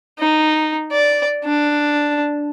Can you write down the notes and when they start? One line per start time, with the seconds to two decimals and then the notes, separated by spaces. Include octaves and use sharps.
0.19 D#4
0.92 D5
1.45 D4